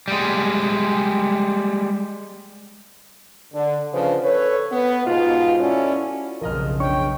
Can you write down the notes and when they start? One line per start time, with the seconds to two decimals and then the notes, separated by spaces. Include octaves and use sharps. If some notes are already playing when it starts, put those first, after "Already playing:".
0.08 G3 G#3
3.53 D3
3.93 C#3 F3 D4 B4 C5
4.23 A4 B4 C#5
4.71 B3
5.05 G#2 B2 F4
5.60 C#4 E4 F#4 A4 D5
6.41 B1 F2 C#3 A#4 D#5 F6
6.80 D4 C#5 G5 C#6